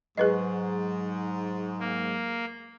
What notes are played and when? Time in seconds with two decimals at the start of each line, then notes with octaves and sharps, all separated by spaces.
0.17 G#2 F#3 G#4 B4 D#5 C#6
1.80 A#3